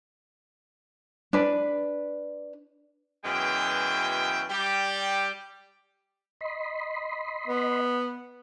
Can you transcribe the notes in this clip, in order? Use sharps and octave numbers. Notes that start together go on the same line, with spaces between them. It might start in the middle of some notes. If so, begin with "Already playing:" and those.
D4 B4
F#2 B2 E3 G#3 G5
G3 G4
D#5 B5 C6
B3